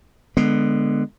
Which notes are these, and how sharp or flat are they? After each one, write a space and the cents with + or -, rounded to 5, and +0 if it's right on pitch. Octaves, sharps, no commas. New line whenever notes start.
D3 +20 G#3 +0 B3 +0